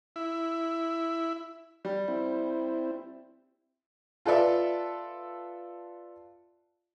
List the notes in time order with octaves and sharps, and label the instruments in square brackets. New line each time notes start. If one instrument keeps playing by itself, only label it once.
[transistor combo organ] E4
[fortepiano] G3
[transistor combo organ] C4 E4
[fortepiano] F4 A4 B4 D5 E5